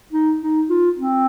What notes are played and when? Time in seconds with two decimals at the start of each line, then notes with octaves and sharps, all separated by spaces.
0.13 D#4
0.42 D#4
0.70 F4
0.98 C4